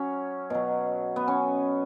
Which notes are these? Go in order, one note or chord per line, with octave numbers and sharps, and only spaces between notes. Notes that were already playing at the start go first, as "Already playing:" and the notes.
Already playing: F#3 C#4
B2 F#3
B3
C#4